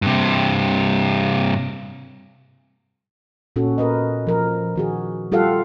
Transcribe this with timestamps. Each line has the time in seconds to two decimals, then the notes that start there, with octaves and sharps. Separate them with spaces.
0.02 G2 C3
3.56 A#2 C#4 F#4 A4
3.78 A#4 B4 D#5
4.27 F3 A#4
4.76 D#3 F#4 G#4
5.32 G3 F4 G4 A4 F5 F#5